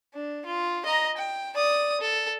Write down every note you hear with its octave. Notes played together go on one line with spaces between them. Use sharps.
D4
F4
D#5 A#5
G5
D5 D#6
A4